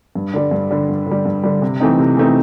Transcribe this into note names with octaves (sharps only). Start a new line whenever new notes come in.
G2
D3 G3
G2
D3 G3
G2
D3 G3
G2
D3 G3
C3
E3 A3 C4 D#4
C3
E3 A3 C4 D#4